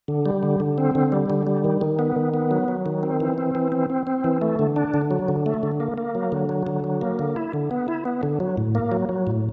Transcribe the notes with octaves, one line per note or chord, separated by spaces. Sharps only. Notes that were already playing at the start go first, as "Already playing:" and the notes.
D3
G3
D3
D3
C4
D3
G3
D3
G3
D#3
D#3
B3
D#3
B3
F#3
F#3
D#3
C4
E3
C4
E3
C4
C4
C4
E3
A3
D3
D4
D3
F#3
D3
A3
D3
A#3
A#3
F#3
D3
F#3
D3
F#3
A#3
D3
E4
D3
B3
E4
B3
D3
F#3
A2
A#3
F#3
F#3
A2